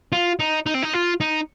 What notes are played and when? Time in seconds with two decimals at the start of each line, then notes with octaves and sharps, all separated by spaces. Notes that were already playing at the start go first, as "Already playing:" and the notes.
0.12 F4
0.40 D#4
0.66 D#4
0.74 C4
0.83 D#4
0.94 F4
1.20 D#4